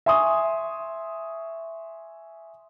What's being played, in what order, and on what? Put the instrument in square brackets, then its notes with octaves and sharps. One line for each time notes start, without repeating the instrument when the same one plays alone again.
[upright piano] E5 G#5 C6 C#6 D#6